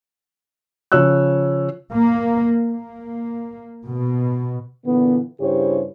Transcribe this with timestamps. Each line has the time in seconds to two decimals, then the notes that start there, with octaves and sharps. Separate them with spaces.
0.92 C#3 F3 C#5 E6 F#6
1.92 A#3
2.70 A#3
3.86 B2
4.85 A#2 D3 E3 B3
5.40 G2 C#3 E4 G4 C5 C#5